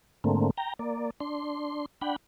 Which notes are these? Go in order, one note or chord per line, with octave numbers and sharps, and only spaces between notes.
G#2 D3 A3 A#3 C4
G5 A#5
A#3 D5
D4 C6
D4 F#5 G5 B5